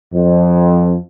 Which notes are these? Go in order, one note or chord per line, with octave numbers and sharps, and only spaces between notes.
F2